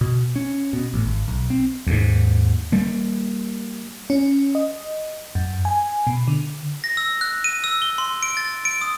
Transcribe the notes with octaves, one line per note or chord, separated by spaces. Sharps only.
B2
C#4
B2
A1
G#1
B1
C4
D#2 G#2
G3 A#3
C#4
D#5
F#2
G#5
B2
D3
A#6
E6
F#6
D#7
E6
G7
C6
D7
A6
D7
D#6